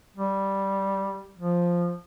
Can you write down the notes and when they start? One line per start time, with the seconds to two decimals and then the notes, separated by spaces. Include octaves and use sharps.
0.17 G3
1.38 F3